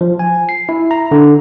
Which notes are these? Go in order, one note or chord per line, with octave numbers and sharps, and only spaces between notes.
F3
G#5
C7
E4
A#5
D3